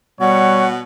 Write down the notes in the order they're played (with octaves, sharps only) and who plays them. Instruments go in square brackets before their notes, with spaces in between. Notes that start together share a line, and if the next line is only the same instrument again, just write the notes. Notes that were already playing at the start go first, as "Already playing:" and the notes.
[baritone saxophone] B2 [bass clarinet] G3 [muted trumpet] C#5 [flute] F#5